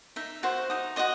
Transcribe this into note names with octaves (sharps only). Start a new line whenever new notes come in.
D#4 E5
F#4 C5
D#4 D#6
F#4 C5 D#5 C6 D#6